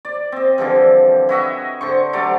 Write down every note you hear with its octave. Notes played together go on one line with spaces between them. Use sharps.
D5
C4 D#5
D3 E3 F3 G3
E4 F#4 D#5 E5
D3 C5 C#6
F#3 G3 A3 D5